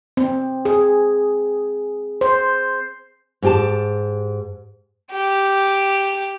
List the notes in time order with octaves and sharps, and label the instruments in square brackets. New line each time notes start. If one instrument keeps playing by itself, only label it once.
[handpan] C4
G#4
C5
[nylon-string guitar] G#2 G4 A5
[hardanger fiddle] G4